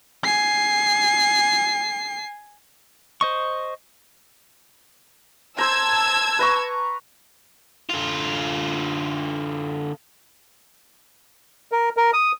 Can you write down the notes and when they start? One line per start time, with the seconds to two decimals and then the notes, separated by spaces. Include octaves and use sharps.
0.24 G#5 C7
3.21 C5 D#5 C#6
5.58 C5 A5 A#5 E6 G#6
6.39 B4 A#5 C#6
7.90 D3 F4
11.72 A#4
11.97 A#4
12.13 D#6